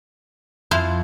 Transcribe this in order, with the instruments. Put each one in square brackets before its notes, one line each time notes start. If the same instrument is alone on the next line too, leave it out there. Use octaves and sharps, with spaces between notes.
[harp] F2 [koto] E4 C5 F5